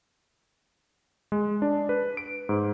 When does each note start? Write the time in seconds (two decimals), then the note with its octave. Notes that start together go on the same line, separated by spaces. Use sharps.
1.32 G#3
1.62 D4
1.89 B4
2.17 D7
2.49 G#2